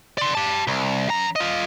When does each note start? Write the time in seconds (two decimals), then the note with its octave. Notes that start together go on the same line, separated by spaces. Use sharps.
0.18 D5 C6
0.35 G4 A5
0.68 C2
1.09 F#2 A#5
1.36 F4 D#5